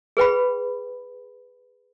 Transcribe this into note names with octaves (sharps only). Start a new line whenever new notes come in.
G#4 B4 G5 B5